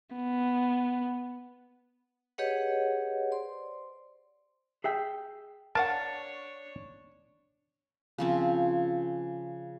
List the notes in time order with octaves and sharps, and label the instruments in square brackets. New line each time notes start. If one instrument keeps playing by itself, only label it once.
[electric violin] B3
[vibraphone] G4 G#4 B4 C#5 D#5 F#5
C5 D5 C6
[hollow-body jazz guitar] G#4 E5 G5
[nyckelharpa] D4 C#5 [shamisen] A#4 F5 F#5 [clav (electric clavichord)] A5
[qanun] C#3 F3 C4